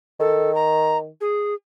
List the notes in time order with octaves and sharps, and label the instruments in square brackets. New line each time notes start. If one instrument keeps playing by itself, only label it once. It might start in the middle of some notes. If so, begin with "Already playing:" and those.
[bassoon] D#3 [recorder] A4
[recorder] A#5
G#4